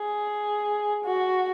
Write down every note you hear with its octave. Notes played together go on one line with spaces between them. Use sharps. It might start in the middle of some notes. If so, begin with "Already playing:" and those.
Already playing: G#4
F#4